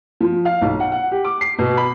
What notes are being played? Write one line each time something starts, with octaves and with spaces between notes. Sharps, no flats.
F3
F5
B1
F#5
F#5
G4
D6
C7
B2
B5